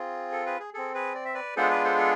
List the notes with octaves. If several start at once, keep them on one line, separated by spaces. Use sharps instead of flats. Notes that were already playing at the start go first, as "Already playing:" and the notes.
Already playing: C4 F4 G#4
A4
G#4 B4
G#4
C4 G#4 A4
G#4 B4
D5
E5
B4 D5
G#3 B3 D4 F4 G#4 A4 C5
B4 D5
A4 C5
A4